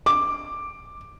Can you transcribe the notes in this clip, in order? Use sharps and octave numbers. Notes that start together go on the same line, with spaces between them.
D6